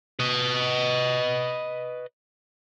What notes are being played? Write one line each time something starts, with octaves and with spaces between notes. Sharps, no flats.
B4 D#5